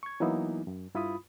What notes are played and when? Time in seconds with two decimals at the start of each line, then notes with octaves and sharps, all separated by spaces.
0.03 C#6 G#6
0.20 E3 F#3 A#3 B3 D#4 E4
0.67 F#2
0.95 G2 E4 F4 B5 D#6